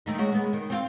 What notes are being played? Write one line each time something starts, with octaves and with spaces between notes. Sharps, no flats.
D#3 A3 D#4
G#3 C#4 F#4
G#3 B3
D#3
C4 F4